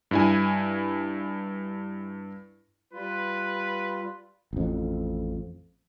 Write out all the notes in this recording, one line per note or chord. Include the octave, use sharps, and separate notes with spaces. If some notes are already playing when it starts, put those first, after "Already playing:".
G2 E4 G#5
G3 F4 B4
A1 F2